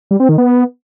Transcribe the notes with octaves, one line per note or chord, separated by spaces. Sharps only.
G3
C4
D#3
B3